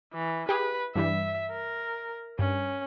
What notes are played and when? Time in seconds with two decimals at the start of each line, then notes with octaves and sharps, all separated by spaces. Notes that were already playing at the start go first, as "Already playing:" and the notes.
0.13 E3
0.49 G4 G#4 B4
0.96 G2 E3 G3 E5
1.51 A#4
2.39 G2 C#4